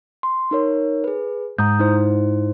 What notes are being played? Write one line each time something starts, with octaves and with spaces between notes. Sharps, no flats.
C6
D#4 A#4 C#5
G#4 B4
G#2 A#5 D#6 G6
D#4 E4 C5